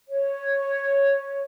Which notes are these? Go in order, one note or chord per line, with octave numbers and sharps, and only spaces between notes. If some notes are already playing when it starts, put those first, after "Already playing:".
C#5